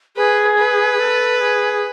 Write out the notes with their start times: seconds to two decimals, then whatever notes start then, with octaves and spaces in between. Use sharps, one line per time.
0.16 G#4 B4
0.57 B4
0.99 A4
1.41 G#4